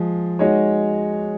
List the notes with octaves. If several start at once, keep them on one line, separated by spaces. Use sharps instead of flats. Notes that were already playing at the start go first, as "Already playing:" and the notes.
Already playing: F3 G#3 G#4
G#3 D#4 F#4 C#5